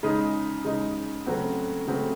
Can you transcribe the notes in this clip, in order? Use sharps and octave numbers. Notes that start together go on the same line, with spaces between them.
C#3 G#3 D#4
C#3 G#3 D#4
C#3 F#3 A3 C4 F#4
C#3 F#3 A3 C4 F#4